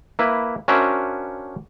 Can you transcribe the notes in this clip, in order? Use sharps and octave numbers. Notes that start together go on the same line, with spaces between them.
A#3 E4 B4
C#4 D4 F#4 A#4 C5 E5